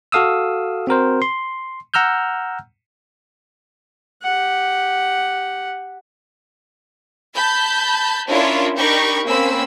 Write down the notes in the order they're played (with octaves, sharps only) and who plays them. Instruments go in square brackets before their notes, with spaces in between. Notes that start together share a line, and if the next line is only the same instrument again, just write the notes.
[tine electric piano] F#4 A4 F5 D#6 E6
C4 F#4 A#4 C5
C6
F#5 A#5 E6 F6 G6
[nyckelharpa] G4 F#5
[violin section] A5 B5 G6
C#4 D4 E4 F4 A#4 C#5
D4 D#4 G4 A#4 B5 C#6
A#3 C4 C#4 B5 E6